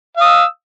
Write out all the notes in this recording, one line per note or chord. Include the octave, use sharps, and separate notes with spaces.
F5 D#6 E6